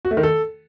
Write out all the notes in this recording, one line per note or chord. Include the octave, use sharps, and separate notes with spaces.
F#4
A3
D#3
A4